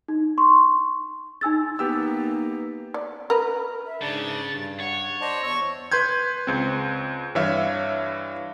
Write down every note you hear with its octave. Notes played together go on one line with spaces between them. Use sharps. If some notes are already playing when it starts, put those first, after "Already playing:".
D#4
C6 C#6
D#4 G#5 E6 A6
A#3 B3 D#4 G4 E6
D5
A#4 B4
E5
G#2 C#3 D4 A6
G2
C#5 F#5
C5 D5 D#5 A5
E2 C#6 E6
B4 C6 G6 G#6
C#2 C4
G2 E3 C#5 E5 F5